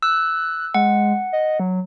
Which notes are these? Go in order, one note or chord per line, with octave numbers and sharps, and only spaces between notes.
E6 F#6
G#3 F#5
D#5
F#3